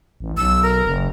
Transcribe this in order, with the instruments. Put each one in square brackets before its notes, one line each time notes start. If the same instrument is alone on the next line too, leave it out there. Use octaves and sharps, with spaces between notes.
[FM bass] A1
[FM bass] B1 [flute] E6
[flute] A#4
[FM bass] F#1